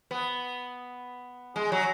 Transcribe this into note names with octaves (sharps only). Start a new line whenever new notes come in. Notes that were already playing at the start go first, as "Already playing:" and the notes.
B3
G#3
F#3